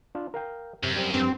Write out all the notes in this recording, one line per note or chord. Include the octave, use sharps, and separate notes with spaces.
D4 F4
A#4 F5 G5
F#2 C3
G3 C4
G2 C4